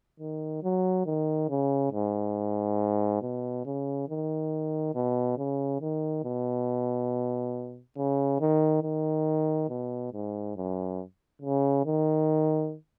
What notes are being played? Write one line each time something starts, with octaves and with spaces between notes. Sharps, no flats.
D#3
F#3
D#3
C#3
G#2
B2
C#3
D#3
B2
C#3
D#3
B2
C#3
D#3
D#3
B2
G#2
F#2
C#3
D#3